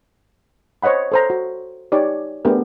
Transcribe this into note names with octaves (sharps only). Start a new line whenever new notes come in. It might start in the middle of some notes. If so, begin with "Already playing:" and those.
C5 C#5 D#5 F#5 B5
A4 C5 A#5
F#4
D#4 G4 C#5 D5
A3 B3 D4 G4 G#4 A#4